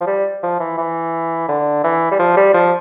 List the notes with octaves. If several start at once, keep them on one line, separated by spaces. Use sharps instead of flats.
F3
G3
F3
E3
E3
D3
E3
G3
F3
G3
F3